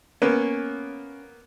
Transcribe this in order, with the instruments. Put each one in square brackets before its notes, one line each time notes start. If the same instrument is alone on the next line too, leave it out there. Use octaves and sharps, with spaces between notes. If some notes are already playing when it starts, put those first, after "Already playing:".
[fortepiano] A#3 B3 [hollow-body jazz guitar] C#4